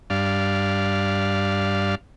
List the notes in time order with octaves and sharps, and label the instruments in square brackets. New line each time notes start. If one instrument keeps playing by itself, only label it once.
[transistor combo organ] G2 D4 F5